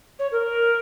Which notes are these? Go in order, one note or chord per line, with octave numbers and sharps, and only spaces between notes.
C#5
A#4